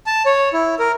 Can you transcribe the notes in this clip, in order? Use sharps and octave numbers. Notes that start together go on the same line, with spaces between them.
A5
C#5
E4
A#4